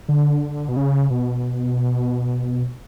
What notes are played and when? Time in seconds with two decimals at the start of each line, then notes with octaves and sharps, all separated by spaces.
0.09 D3
0.69 B2
0.77 C#3
1.10 B2